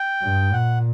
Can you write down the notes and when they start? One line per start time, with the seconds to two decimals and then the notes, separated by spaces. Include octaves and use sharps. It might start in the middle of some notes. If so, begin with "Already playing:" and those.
Already playing: G5
0.22 G2
0.52 A#2 F#5